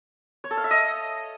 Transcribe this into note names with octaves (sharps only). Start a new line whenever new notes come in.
C#5
A4
F5
E5
D#5